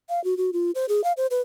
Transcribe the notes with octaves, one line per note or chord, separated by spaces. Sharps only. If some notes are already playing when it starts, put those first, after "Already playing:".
F5
F#4
F#4
F4
C5
G#4
F5
C5
B4